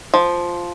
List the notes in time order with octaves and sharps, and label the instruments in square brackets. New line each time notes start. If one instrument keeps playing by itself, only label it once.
[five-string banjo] F3